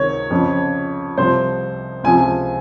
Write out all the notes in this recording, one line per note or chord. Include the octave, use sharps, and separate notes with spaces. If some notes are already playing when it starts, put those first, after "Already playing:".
Already playing: C#2 C3 D#3 C#5
F2 C#3 F3
C2 C3 F3 C5
C#2 C3 F3 G#5